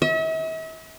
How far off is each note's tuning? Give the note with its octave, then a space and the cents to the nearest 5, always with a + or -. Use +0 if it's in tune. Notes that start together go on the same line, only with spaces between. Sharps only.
E5 -45